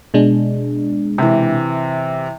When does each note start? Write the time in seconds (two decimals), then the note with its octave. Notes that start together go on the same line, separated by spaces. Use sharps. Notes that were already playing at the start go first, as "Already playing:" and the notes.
0.14 B2 G#3 D4
1.18 C3 E3